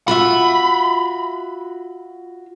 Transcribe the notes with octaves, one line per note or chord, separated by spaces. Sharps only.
F4 F#4 E5 B5